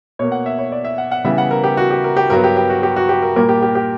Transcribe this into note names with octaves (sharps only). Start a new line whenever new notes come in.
B2 A#3 C#5
F#5
E5
C#5
D5
E5
F#5
F#5
C#3 E3 G3 B3 E5
F#5
A#4
G4
F#4
G4
A#4
G4
G2 F#3 B3 A#4
G4
G4
F#4
G4
F#4
G4
A#4
A#2 G3 A#3 A#4
G4
G4
G4